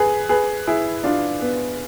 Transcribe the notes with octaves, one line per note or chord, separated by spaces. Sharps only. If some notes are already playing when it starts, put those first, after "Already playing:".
Already playing: G#4 B4
G#4 B4
E4 G#4
D4 F4
B3